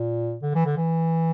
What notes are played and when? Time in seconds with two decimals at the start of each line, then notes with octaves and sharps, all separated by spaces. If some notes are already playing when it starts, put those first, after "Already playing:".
Already playing: A#2
0.42 D3
0.55 E3
0.66 D3
0.77 E3